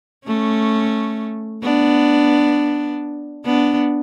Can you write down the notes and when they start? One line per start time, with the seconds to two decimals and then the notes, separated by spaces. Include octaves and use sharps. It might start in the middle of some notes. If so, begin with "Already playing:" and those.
0.27 A3 C#4
1.63 B3 D4
3.45 B3 D4